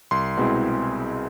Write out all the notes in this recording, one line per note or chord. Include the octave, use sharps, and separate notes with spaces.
C2 C6
B2 G#3 C4 E4